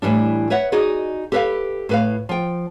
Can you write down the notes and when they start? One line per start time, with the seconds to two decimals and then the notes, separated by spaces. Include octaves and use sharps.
0.02 A2 E3 G3 D4
0.50 B4 C#5 E5 F#5
0.72 D#4 F#4 G#4 D5 D#5
1.32 G4 A4 B4 C5 E5 F5
1.89 A2 B4 F5
2.29 F3 G5